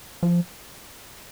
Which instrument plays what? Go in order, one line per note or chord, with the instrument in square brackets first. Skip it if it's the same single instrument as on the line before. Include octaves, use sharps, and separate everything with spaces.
[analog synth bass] F3